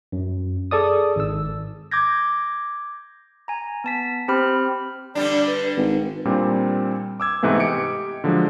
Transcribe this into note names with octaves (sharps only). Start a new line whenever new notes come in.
F#2
G#4 A4 D5 D#6
G#1 E6
D6 G6 G#6 A#6
G#5 A#5
B3 A5 B6
C4 G4 C5 B5 F6
D3 G3 D4 D5
B4
G#1 B4
A#2 G3 C4 D4
D6 E6 G#6
G#2 C3 E3 A3 B3
G4 D#5 C#7 D7
D3 F3 F#3 G#3